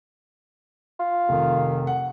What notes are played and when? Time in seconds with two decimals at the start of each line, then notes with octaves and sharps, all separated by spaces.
1.00 F4
1.29 F1 D#3
1.87 F#5